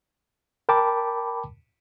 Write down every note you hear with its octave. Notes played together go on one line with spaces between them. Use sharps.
A#4 G5 A5 B5 D6